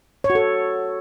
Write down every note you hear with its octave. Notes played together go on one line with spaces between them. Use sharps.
C#5
F#4
A4